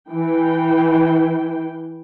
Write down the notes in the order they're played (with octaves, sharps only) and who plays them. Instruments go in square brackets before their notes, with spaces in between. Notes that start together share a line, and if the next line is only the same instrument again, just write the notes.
[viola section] E3 G5